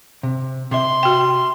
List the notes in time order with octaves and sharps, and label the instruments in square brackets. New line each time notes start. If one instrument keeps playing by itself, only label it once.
[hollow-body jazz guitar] C3
[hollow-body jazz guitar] C3 E5 [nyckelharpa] C6
[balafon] F#4 G5